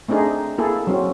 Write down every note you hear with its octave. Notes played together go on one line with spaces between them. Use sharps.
A3 C4 D4 D#4 G#4
A#3 E4 G#4 A4
F#3 C4 C#4